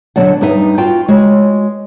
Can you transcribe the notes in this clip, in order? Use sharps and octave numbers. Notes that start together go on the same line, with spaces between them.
B2 D3 F#3 D5 F#5
G2 B3 D#4 B4 E5
F4 F#4 G5
G#3 F#4 C#5